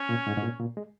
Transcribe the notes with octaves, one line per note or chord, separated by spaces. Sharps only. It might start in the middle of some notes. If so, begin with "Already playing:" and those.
Already playing: C#4
A#2
G#2
G#2
A#2
A#2
G#3